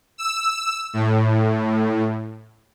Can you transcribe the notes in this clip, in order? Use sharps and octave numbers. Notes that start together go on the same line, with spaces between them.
E6
A2